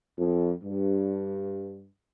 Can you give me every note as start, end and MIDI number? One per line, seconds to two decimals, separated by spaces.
0.18 0.53 41
0.64 1.87 43